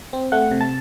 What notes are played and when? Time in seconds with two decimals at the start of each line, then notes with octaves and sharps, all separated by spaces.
0.13 C4
0.32 A3 F#5
0.51 C3
0.61 A5